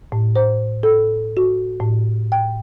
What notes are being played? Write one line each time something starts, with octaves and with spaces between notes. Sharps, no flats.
A2
C5
A4
F#4
A2
G5